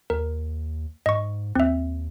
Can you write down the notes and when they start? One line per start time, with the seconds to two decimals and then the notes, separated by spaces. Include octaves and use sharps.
0.10 D#2 A#4
1.06 G#2 D#5 C#6
1.55 D#2 C4 E5